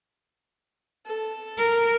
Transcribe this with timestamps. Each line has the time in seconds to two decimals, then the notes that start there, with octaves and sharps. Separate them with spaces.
1.05 A4
1.58 A#4